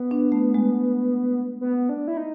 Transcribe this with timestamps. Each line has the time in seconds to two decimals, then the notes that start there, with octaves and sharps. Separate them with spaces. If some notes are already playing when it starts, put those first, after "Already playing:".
Already playing: B3
0.11 D4
0.32 A3
0.54 G#3
1.61 B3
1.89 D4
2.08 E4
2.17 D#4